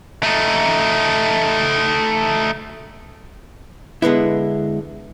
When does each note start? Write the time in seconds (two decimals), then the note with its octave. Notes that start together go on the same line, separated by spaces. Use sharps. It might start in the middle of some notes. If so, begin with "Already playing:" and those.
0.23 A3 D#4
4.02 D3 G#3 B3 E4